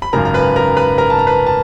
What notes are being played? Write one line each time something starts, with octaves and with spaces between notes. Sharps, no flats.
B5
G#1 F#2 C#3 A#4 A#5
A#5
B4 B5
A#4 A#5
B4 B5
A#4 A#5
A5
A#5
B4 B5
A5